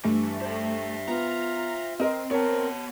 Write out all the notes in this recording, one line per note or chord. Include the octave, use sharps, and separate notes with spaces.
G2 E3 A3
C5 E5
B3 F4 A#5
C4 A#4 D#5
B3 A#4 C#5 A5